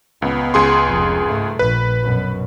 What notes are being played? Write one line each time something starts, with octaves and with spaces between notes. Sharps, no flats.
C#2 B3
C#2 G#4 C6
F1
G#2 A3
A#1 B4
F#2 B2